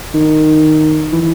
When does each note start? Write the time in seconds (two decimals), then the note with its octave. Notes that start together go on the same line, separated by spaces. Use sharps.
0.14 D#3
1.12 E3